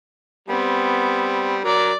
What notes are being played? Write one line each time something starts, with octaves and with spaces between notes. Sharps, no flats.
G3 B3 C4
F#3 A#4 D5